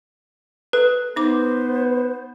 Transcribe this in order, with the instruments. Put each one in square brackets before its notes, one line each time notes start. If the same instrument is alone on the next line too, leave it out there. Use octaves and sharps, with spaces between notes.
[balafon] A4 [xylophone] B4
[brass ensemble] B3 [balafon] D#4 D6 [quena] C5